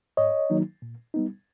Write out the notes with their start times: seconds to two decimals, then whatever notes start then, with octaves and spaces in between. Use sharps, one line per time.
0.17 G#2 C#5 D#5
0.50 D#3 F#3 A#3 D#4
0.82 A#2
1.14 G3 B3 D#4